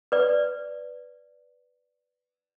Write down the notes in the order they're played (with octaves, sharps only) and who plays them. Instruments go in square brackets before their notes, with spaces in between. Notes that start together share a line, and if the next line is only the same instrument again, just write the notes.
[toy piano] B4 D5